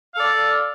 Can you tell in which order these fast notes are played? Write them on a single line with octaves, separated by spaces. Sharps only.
F5 A4 D5